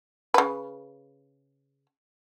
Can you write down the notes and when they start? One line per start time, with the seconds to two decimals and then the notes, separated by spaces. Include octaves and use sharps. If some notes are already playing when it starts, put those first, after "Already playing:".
0.34 C#3 B4